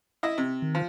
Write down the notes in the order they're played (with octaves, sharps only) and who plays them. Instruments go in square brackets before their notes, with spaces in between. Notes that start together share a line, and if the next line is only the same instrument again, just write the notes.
[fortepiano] E4 D#5 E5
C3
[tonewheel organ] D#3
[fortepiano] F3